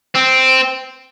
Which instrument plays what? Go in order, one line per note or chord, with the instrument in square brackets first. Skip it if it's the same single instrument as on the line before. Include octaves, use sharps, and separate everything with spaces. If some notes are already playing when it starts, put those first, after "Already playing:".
[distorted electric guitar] C4